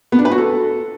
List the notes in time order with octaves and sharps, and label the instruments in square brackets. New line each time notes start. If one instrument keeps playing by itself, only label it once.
[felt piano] B3
D4
B4
F#4
A4